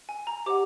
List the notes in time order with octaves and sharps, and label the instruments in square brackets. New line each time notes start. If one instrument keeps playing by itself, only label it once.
[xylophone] G#5
A#5
G4 C5 D#5 F#5 D6